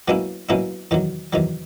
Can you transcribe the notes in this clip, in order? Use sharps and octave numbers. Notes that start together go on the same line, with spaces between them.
B2 F#3 A#3 C#4 E4
B2 F#3 A#3 C#4 E4
E2 C3 D#3 F#3
E2 C3 D#3 F#3